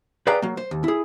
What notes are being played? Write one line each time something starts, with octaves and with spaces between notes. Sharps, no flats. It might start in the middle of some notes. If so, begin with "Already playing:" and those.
G#4 B4 D5 F5 G5 A#5
F#3 A#3
C5
D#2
E4 G#4